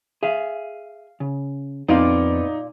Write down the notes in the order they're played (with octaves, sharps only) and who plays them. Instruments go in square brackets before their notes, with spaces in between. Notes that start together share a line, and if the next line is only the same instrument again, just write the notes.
[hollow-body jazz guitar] G#4 E5 [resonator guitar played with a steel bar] F5
[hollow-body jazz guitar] C#3
[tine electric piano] F2 [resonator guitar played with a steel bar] A#2 D5 F5 [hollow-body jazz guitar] B3 C4 F4 [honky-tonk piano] D#4